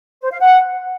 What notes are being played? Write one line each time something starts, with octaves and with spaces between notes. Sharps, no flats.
C5
F5
F#5